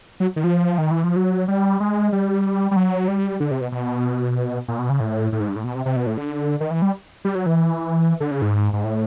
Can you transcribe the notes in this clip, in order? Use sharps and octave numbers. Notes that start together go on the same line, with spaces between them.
F#3
D#3
F3
D#3
E3
F3
F#3
G3
G#3
G3
G3
F#3
G3
D3
C3
B2
B2
A#2
B2
C#3
A2
A2
G#2
G2
A2
B2
C3
C3
B2
A2
D3
D#3
E3
G3
G3
F#3
E3
D3
C#3
G#2
G#2
A2